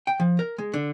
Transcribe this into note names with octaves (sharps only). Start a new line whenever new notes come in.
G5
F3
A#4
G#3
D3